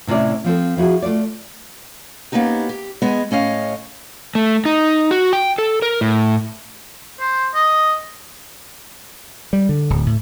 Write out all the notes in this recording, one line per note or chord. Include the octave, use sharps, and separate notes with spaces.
A2 C3 C#4 E4 D5
F3 C4 A4
F3 E4 F#4 G#4
A3 F4 D5
A#3 B3 C#4 D#4 G4
G4
G#3 B3 G#4 D#5
A2 C#4 D#5 F5
A3
D#4
F#4
G5
A4
A#4
A2
C5
D#5
G3
D3
D1
A2